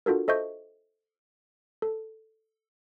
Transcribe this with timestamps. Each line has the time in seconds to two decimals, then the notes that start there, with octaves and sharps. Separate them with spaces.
0.06 D4 F4 F#4 A4 A#4
0.28 A4 C5 D#5 E5 C#6 G6
1.82 A4